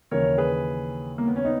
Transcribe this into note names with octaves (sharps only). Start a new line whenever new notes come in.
D#2 C#3 E3 A#4 C#5
G#4 B4
A#3
B3
C#4
B3 D#4